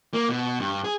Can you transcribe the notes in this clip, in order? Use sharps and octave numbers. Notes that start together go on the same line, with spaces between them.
A#3
B2
G2
G#4